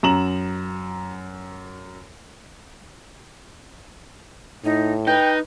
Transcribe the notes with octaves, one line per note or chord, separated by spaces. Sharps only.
F#2 A#5 E7 F#7
A2 D#4
D#4 B4 G5